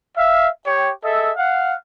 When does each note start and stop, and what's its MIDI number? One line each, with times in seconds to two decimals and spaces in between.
0.17 0.49 76
0.17 0.49 77
0.65 0.89 67
0.65 0.89 73
0.65 0.89 79
1.04 1.31 68
1.04 1.31 69
1.04 1.31 75
1.04 1.31 76
1.37 1.75 77
1.37 1.75 78